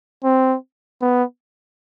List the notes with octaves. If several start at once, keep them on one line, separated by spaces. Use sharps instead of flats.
C4
B3